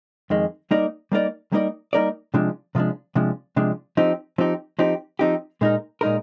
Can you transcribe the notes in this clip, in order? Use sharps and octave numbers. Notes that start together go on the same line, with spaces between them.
F2 D#3 G#3
G3 A#3 D#4 A#4 D5
G3 A#3 D#4 A#4 D5
G3 A#3 D#4 A#4 D5
G3 A#3 D#4 A#4 D5
C3 F3 G#3 D4
C3 F3 G#3 D4
C3 F3 G#3 D4
C3 F3 G#3 D4
F3 C4 D#4 G4
F3 C4 D#4 G4
F3 C4 D#4 G4
F3 C4 D#4 G4
A#2 G#3 D#4 A#4
A#2 G#3 D#4 A#4